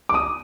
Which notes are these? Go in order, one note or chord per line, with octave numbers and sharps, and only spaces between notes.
D6
D#6